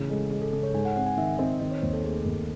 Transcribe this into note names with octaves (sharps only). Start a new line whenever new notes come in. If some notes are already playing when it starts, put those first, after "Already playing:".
Already playing: A2 C#3 E3
G#3 A4
G#3 G#4
A4
C#3 A4
C#5
G#2 G#5
F#5
C4 F#5
G#5
D#3 E5
C4 D#5
D#3 D#5
C#5
D#2 C5
A4
A3 G#4
D#2 A4